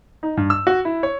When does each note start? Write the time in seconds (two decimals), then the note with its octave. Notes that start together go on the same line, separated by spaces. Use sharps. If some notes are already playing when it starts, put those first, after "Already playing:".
0.23 D#4
0.37 G2
0.50 E6
0.67 F#4
0.85 E4
1.03 C#5